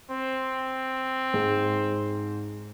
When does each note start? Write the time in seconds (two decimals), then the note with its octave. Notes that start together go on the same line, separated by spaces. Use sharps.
0.12 C4
1.34 G#2